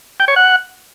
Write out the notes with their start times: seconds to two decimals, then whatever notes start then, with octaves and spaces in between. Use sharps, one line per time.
0.20 G5
0.28 C#5
0.36 F#5